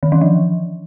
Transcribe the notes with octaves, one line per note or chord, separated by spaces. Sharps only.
D#3
E3
F3